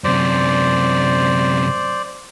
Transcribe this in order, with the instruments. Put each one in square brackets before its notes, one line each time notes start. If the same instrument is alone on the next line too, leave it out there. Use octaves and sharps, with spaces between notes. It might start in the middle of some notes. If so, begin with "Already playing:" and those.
[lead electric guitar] F#2 C3 [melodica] C5 D5